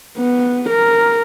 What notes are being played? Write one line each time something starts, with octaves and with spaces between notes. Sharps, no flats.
B3
A#4